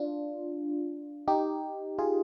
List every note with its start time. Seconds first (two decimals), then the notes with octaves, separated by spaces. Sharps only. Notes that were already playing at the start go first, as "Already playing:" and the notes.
Already playing: D4 F4
1.28 D#4 G4
1.98 F4 G#4